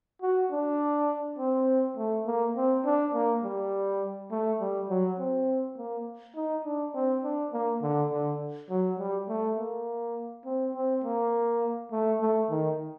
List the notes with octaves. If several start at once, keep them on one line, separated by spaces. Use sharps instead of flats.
F#4
D4
C4
A3
A#3
C4
D4
A#3
G3
A3
G3
F#3
C4
A#3
D#4
D4
C4
D4
A#3
D3
D3
F#3
G3
A3
A#3
C4
C4
A#3
A3
A3
D#3